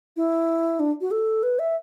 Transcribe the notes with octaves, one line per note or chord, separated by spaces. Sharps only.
E4
D4
F#4
A4
B4
E5